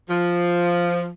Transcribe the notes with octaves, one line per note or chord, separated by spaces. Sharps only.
F3